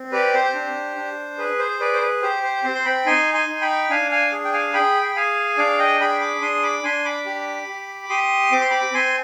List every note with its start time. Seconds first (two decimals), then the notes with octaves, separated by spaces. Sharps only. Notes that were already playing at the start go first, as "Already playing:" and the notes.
Already playing: C4
0.12 G4 B4 D5
0.34 C5
0.54 D4
0.96 D4
1.38 G#4 B4
1.59 C5
1.80 G#4 B4 D5
1.94 C5
2.01 B4
2.22 G4 C5
2.43 C5
2.64 C4 C5
2.75 C6
2.85 G5 B5
3.06 D#4 G#5 C6
3.34 G#5 C6
3.48 D#4
3.62 G5 B5
3.90 D4 F5 G#5
4.11 F5 G#5
4.32 G#4
4.45 G5
4.53 F5 G#5
4.74 G#4 G5 B5
5.05 G5
5.16 G#4 F5 G#5
5.58 D4 D5 F5
5.79 D#5 G5
6.00 G#4 G5 B5
6.20 B5 D6
6.41 D4 C6 D#6
6.63 B5 D6
6.83 D4 G#5 C6
7.05 B5 D6
7.26 G4
7.68 G4
8.09 G4 C6 D#6
8.52 C4 D6
8.61 C6
8.70 B5 D6
8.94 C4 G#5 C6